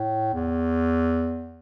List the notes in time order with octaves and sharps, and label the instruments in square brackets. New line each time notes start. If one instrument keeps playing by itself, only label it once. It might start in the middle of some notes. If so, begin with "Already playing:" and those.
Already playing: [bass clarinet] A2
E2